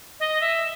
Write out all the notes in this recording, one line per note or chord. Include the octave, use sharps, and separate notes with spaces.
D#5
E5